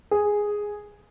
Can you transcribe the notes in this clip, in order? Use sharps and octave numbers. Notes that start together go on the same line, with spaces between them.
G#4